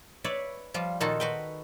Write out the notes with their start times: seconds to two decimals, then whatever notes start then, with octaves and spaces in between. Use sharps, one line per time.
0.24 B4 C#5 D5 E5
0.74 F3 G3 F4
1.00 A#2 D#3 D#4 F4 F#4 A4
1.20 F#4 B4 G5